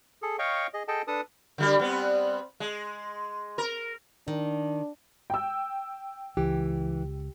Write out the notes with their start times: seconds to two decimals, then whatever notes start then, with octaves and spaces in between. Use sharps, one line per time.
0.22 G#4 A4
0.39 C#5 D#5 F5 G5 C#6
0.74 G#4 D#5
0.88 G#4 A4 D#5 G5 A5
1.07 D4 A4 B4 A5 D#6
1.58 D3 G3 G4
1.79 G3 B3 C4
2.60 G#3
3.58 A#4
4.28 D#3 D4
5.30 G5 E6
6.37 C#2 E3 G4